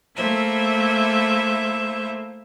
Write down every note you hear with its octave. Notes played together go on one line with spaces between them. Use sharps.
A3 A#3 E4 C5 E5